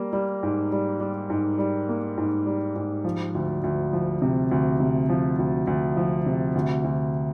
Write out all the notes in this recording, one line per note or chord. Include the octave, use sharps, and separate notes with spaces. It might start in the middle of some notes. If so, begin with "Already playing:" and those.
Already playing: G3 A#3
G3
G#2
G3
G3
G#2
G3
A#3
G#2
G3
G#2
F3
D2
D2
F3
C3
D2
C3
F3
D2
D2
F3
C3
D2
D2